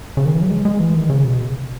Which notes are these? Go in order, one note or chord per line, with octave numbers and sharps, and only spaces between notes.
C#3
D#3
E3
F#3
G#3
G#3
E3
D#3
C#3
B2